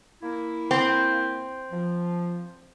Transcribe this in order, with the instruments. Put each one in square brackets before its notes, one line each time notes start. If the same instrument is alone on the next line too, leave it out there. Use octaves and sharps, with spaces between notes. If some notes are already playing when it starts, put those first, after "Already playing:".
[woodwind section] A#3 E4
[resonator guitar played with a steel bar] C4
[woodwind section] F3